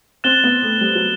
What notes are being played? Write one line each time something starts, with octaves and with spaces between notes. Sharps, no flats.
C4 F#6 A6 E7 G7
B3
A3
G3
F#3